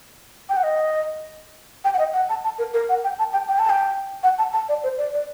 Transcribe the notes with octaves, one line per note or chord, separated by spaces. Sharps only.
G5
F#5
D#5
G5
F#5
D#5
F#5
A5
A5
A#4
A#4
F#5
G5
A5
G5
G5
A5
G5
F#5
A5
A5
D5
C5
D5
D5